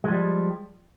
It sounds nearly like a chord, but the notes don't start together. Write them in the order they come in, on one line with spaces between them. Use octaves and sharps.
G#3 F3 G3